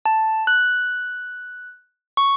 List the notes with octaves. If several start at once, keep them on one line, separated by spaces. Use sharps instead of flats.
A5
F#6
C#6